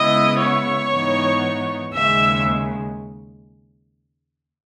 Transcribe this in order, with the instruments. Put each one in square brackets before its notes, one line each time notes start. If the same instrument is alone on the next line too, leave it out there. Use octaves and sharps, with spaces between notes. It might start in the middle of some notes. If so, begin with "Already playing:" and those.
Already playing: [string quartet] C#3 G#3 B3 E4 D#5 D#6
C#5 C#6
G#2 E3 B3 D#4
D#2 C#3 G#3 E5 E6